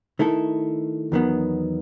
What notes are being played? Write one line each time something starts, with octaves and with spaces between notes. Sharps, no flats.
D#3 A3 E4 A4
E2 D#3 F#3 B3